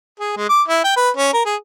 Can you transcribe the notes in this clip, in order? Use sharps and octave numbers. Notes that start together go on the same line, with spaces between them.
G#4
G#3
D6
E4
G5
B4
C#4
A#4
G#4